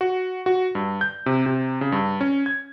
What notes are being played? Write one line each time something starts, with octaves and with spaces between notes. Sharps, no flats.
F#4
F#4
G2
G6
C3
C3
C#3
G2
C#4
G#6